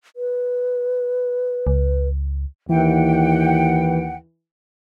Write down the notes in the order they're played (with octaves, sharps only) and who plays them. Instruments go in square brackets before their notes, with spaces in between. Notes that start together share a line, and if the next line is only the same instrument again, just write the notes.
[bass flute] B4
[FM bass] C#2
[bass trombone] D#2 [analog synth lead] E3 [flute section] F#5 G5